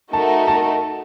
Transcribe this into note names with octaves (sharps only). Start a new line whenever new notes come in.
A3 D#4 F#4 A#4 A5
A5